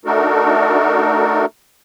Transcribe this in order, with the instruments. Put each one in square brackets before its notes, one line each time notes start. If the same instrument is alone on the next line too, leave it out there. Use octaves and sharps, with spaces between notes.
[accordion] A3 D4 D#4 F#4 A4 A#4